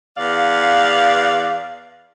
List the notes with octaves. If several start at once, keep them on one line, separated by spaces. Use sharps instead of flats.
E2 D5 F5